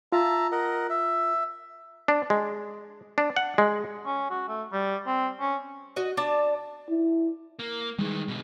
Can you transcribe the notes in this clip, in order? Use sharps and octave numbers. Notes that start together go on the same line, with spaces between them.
F4 E5 A5 A#5
A#4 D#5 F#5
E5
D4
G#3
D4
F#5
G#3
C#4
F#4
A3
G3
C4
C#4
F#4 D#5
D4 A5
E4
A#3
D#3 E3 G3 G#3
B2 D3